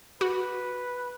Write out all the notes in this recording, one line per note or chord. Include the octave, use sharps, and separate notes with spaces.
F#4 B4